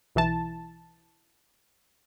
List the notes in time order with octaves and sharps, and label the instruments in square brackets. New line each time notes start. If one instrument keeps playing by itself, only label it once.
[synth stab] B1 E3 A5